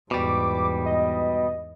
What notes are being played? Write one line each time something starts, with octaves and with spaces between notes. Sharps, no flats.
E2 G#2 B2 G3 D6
D#5